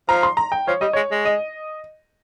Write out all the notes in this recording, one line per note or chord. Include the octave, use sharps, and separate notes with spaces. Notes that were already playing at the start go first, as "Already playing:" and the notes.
F3 A#5
C6
A#5
G5
F3 C#5
G3 D#5
G#3 C#5
G#3
D#5